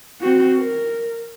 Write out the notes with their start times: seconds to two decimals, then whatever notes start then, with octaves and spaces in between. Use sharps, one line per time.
0.21 C4 F#4
0.57 A#4